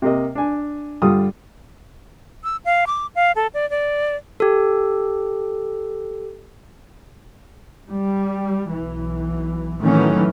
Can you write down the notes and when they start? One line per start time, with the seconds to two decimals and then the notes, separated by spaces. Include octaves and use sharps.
0.02 C3 A#3 D#5
0.35 D4 G#5
1.02 G2 D3 G3 F4 D#6
2.44 E6
2.65 F5
2.87 D6
3.15 F5
3.36 A4
3.54 D5
3.70 D5
4.40 G4 A4
7.88 G3
8.69 B1 E3
9.80 A2 D#3 E3 F#3 A3 C#4